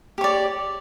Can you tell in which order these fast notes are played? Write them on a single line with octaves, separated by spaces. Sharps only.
G4 C#5 D5